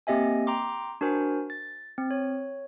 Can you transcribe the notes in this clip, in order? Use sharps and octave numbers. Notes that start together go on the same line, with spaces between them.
A#3 C4 G4 D#5 E5 G#5
G5 A#5 C6 D6
D4 F#4 A#4 C5 G#5
A6
C4
C#5